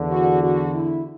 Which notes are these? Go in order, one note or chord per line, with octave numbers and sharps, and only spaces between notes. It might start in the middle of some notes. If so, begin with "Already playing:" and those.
Already playing: E2 D3
F#4
F#4
E4